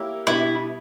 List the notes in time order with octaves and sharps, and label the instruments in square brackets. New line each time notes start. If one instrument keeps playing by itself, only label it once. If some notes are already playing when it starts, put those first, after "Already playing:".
Already playing: [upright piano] A#3 E4 G4 A#4 C#5
[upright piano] B2 G3 B3 D4 [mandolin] E4